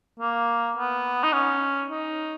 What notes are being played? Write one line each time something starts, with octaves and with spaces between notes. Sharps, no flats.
A#3
B3
D#4
C#4
D#4